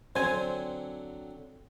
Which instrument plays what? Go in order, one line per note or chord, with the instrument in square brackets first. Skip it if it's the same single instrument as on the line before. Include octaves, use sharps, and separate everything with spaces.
[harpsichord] D3 F#3 C4 [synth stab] C5 G#5